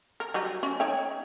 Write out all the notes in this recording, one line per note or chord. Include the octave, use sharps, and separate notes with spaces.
A#4
F#3 G3 D#4
C#4
D#4 C#5 G5